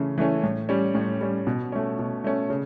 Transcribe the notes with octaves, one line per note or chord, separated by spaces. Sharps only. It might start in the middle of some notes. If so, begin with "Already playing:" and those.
Already playing: C#3 E3 A3 C#4
E3 A3 C#4
A2
G3 C#4
A2
G3 C#4
B2
A3 C#4
B2
A3 C#4
C#3